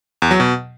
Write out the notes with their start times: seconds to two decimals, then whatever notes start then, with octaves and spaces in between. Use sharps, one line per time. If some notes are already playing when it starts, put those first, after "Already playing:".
0.22 E2
0.31 F#3
0.40 B2